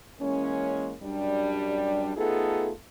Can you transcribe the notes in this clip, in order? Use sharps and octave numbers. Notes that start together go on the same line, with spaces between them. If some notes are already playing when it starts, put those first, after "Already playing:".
E3 G#3 A#3 C#4
F#2 G3 D4
A3 B3 D#4 F4 G#4 A4